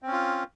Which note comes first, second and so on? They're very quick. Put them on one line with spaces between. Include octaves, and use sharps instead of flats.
C4 C#4 F4